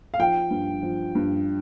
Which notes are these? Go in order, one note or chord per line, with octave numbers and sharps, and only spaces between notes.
F5
F3 G5
G2
F3
G2